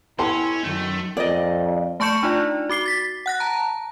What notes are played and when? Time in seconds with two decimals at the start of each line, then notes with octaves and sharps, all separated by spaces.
0.19 B3 C#4 E4 G4 A4 C6
0.64 F#2 D#3 A3
1.17 F2 D5 D#5
2.00 A3 A5 C#6 G6 C#7 E7
2.23 D4 D#4 F4 D5
2.69 F#4 D6 C7 G7
2.86 A6 B6
3.26 F#5 F#6 A#6
3.40 A5 A#5